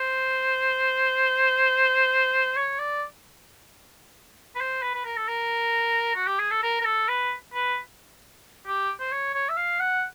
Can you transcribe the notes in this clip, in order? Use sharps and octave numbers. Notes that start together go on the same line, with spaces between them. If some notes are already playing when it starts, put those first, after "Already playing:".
Already playing: C5
C#5
D5
B4
C5
B4
B4
A#4
A4
A#4
F#4
G4
G#4
A4
A#4
A#4
A4
B4
B4
G4
C5
C#5
C#5
E5
F5
F#5